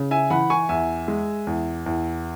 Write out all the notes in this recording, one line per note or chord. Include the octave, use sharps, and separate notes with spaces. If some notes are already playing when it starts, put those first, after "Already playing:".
Already playing: C#3
E5 G#5
E3 F#5 B5
G#5 C#6
E2 E5 G#5
G#3
E2
E2